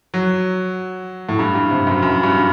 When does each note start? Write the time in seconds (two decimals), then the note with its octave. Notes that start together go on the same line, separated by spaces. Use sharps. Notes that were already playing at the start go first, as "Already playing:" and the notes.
0.14 F#3
1.29 A2
1.39 G2
1.55 G2
1.70 C3
1.87 F#2
2.02 F#2
2.23 G2